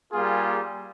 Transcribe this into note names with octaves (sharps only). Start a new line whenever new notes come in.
G3 A#3 F4 G#4